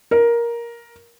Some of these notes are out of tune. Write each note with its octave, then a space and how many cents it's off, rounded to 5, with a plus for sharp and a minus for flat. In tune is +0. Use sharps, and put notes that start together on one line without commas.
A#4 +10